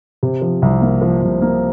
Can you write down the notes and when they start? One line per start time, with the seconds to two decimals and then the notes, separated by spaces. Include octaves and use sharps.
0.23 C3
0.42 F3
0.62 C2
0.82 A#3
1.02 F3
1.22 C2
1.42 A#3